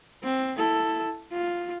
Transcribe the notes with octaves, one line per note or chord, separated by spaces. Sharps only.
C4
E4 A4
F4